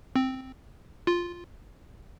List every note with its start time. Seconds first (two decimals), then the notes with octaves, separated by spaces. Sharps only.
0.16 C4
1.07 F4